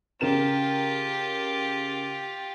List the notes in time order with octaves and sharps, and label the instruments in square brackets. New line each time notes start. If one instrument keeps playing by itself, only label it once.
[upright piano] C#3 A#4 E7 [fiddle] F4 G4